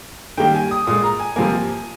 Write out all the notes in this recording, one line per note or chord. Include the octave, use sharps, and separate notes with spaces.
D#3 G3 A#3 G5
G#5
D#6
A#2 G#3 D#6
A#5
G#5
C3 F3 A#3 G#5